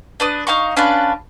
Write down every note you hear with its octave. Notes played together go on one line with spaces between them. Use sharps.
D4 B4 D#6
D#4 F5 A#5 C#6
C#4 D4 F4 B4